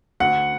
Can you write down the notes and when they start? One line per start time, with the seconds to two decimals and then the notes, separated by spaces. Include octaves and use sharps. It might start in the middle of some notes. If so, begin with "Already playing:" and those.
0.20 D2 F#5